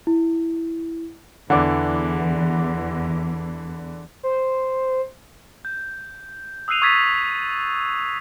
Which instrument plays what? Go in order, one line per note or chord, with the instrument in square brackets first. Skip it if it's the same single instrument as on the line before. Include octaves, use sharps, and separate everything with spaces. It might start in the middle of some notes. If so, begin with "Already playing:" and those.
[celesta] E4
[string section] E2 [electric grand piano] D3 E3 [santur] D5 F#5
[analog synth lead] C5
[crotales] G6
D#6 E6 F#6 C7 D#7 F7
C#6 D#6 E6 G#6 A6 B6